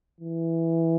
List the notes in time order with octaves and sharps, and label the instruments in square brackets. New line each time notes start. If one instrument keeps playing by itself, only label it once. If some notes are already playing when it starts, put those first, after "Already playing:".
[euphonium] E3